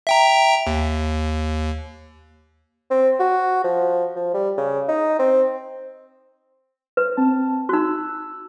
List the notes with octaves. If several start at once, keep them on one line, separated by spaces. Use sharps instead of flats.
E5 G5 A#5
D#2
C4
F#4
F3
F3
G3
C#3
D#4
C4
B4
C4 A5
D#4 F#4 E6 F#6